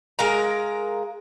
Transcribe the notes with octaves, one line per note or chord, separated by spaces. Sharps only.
G#3 A#4 F5 A#5